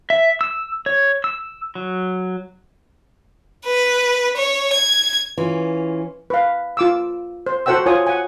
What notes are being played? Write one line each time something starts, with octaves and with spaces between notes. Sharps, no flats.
E5
E6
C#5
E6
F#3
B4
C#5
G#6
E3 C#4 F4
B4 F5
F4 D6 E6
C5
F#4 A4 C5 F#5 G5 E6
F4 C5 C#5 G#5 D#6
F#5 G#5